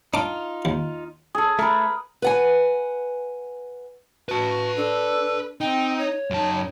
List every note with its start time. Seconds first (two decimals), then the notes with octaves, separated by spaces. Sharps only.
0.14 D4 D#4 F4 D6
0.65 D#2
1.35 G#4 A4
1.59 A3 A#4 B4
2.22 B4 F#5 G#5
4.29 F#4 B4 A5
4.77 D4 A4
5.61 C4 D#4 G5
5.99 C#5
6.30 F#2 D#4 A5